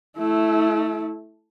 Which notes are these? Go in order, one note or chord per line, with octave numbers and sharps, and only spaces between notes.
A3 E4